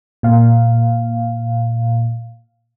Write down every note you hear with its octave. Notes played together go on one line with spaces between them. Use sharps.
A#2 F5